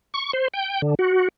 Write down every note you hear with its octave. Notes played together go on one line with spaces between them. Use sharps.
C#6
C5
G5
D3
F#4